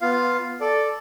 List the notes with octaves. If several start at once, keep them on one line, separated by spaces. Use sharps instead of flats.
B3 F4 F5
A4 D5